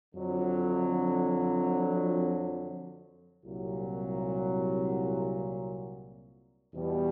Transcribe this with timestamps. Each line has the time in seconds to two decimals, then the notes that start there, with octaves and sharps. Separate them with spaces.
0.15 F2 D3 F#3
3.45 C2 A#2 F#3
6.74 E2 B2 G3